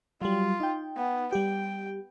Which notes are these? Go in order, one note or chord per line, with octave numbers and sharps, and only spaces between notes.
F#3 G3 F4
D#4 G5
B3
G3 G4 G5